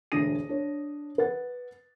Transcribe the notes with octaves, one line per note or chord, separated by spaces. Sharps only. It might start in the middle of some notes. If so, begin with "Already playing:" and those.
E1 D2 D4 D#6 A#6 D#7
D4 C#5
B4 F#5 A6